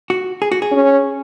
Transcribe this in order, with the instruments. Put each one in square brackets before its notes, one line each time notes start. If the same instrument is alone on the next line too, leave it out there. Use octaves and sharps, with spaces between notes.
[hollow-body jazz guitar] F#4
G#4
F#4
G#4
[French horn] C#4